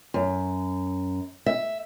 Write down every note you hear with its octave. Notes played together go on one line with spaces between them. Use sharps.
F#2
E5